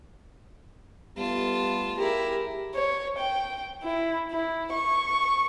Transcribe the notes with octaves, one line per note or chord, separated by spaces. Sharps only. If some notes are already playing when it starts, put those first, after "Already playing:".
G3 A3 B3 F4 A5
E4 G4 G#4 A#4
C#5
G5
E4
E4
C#6